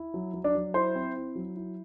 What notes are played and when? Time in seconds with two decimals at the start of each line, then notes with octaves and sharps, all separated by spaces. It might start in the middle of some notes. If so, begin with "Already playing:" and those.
Already playing: E4
0.14 F#3
0.34 F#3
0.44 D4 D5
0.55 F#3
0.74 E4 C5 C6
0.95 C4
1.16 E4
1.35 F#3
1.56 E4